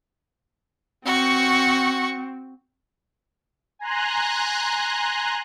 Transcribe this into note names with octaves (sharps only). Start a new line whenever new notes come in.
C4 F#4 C#6
G#5 A#5 C6 F#6